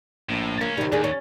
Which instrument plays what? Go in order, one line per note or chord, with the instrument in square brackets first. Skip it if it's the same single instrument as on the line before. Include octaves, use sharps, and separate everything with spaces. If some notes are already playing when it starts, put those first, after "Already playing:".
[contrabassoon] A#1 [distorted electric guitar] A2
[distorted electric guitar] C#2 C#4 [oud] A#3
[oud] C3 G3 [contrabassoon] D#3
[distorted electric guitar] D#2 [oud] D4 G#4
[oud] C#4